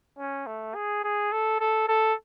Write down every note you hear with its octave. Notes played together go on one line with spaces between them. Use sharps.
C#4
A3
G#4
G#4
A4
A4
A4